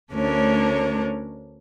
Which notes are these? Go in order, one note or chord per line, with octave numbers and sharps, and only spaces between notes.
D2 A3 C#4 D4 A#4 C#5